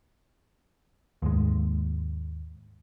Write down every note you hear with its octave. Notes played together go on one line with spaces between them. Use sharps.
D#2 G#2 G#3